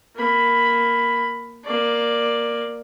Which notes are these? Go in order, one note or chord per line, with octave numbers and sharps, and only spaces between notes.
A#3 B5
A#3 D5